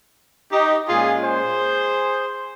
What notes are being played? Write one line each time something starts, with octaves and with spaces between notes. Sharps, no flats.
D#4 G4
A#2 G#3 C#4 F4 G#4
G#4 C5